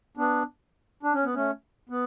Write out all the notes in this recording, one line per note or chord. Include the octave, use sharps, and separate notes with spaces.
B3 D4
D4
C#4
B3
A3 C#4
B3